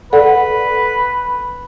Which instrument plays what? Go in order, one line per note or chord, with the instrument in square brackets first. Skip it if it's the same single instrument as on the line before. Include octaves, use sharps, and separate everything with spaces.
[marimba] A4 D5 F#5 [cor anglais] B4